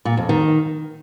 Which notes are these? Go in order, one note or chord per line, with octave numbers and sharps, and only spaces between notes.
A#2
F2
D#3